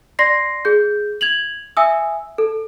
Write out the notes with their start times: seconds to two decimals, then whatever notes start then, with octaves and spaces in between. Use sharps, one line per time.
0.19 D5 C6 A#6 C7
0.65 G#4 G6
1.21 G#6 F7 F#7
1.77 E5 G#5 D#6 E6
2.38 A4